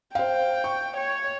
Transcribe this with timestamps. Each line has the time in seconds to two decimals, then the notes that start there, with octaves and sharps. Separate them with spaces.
0.15 C5 F5 G5
0.64 C#6
0.97 C#5